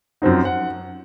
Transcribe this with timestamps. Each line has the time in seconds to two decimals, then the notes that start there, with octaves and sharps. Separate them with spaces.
0.22 F#2 F3 C4 D#4 F#5
0.45 F#5